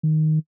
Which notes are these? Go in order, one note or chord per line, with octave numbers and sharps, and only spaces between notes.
D#3